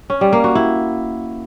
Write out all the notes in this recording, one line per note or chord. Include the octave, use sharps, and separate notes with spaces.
C#4
G3
A#3
F#4
E4